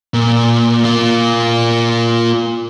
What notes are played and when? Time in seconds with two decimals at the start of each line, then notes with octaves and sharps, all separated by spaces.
0.14 A#2
0.84 A#3 F4